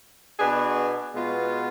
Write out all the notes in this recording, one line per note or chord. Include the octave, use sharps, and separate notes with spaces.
B2 B3 D4 G#4
B2 G#3 B3 F4